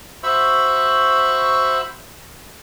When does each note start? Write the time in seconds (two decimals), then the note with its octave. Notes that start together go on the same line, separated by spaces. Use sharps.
0.23 F#4 C5 E5 B5 C#6 E6